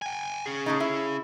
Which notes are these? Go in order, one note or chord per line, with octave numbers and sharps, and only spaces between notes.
G5 G#5
C#4 G#4
A2 C#3 D#4
E4